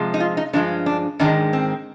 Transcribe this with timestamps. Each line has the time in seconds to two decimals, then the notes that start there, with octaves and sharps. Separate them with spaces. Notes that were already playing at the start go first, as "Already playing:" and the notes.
Already playing: C3 F3 G#3
0.14 D#4
0.20 F4
0.37 D#4
0.53 G2 F3 G#3 D4
0.86 D4
1.19 G#2 D#3 G#3 D4
1.53 C4